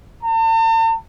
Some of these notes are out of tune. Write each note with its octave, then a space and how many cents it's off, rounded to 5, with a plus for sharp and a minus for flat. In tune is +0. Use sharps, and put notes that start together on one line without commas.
A5 +45